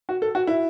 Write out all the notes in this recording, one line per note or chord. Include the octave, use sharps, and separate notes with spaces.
F#4
A4
F#4
E4